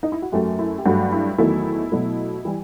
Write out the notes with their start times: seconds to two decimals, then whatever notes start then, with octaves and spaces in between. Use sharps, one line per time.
0.03 D#4
0.12 E4
0.22 F#4
0.32 F#2 F#3 A3 G4
0.59 E4
0.78 G4
0.86 G2 F#3 A3 F#4
1.12 E4
1.38 E2 D#3 F#3 A3 E4
1.92 B2 F#3 A3
2.45 E3 G3